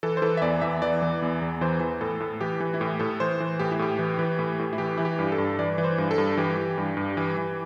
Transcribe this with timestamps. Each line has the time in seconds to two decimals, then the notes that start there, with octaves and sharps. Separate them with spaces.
0.03 E3 A4
0.17 C5
0.22 E3 A4
0.37 E5
0.42 E2 D5
0.61 E2 E5
0.82 E3 D5
1.02 E3
1.22 E2
1.41 E2
1.61 E3 C5
1.80 E3
2.01 A2 A4
2.20 A2
2.41 E3 G4
2.60 E3
2.74 E4
2.81 A2 G4
2.99 A2 A4
3.20 E3 C5
3.40 E3
3.59 A2 G4
3.71 E4
3.79 A2 G4
3.99 E3
4.19 E3
4.39 A2
4.59 A2
4.73 E4
4.78 E3 G4
4.98 E3 E4
5.05 G4
5.19 G2
5.32 A4
5.38 G2
5.59 E3 D5
5.78 E3
5.84 C5
5.98 G2
6.11 A4
6.18 G2
6.37 E3 G4
6.57 E3
6.78 G2
6.97 G2
7.17 E3
7.37 E3